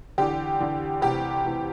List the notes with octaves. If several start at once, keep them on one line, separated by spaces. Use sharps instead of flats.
E2 D3 G4
E2 D3
D2 C3 E3 G4
D2 C3 E3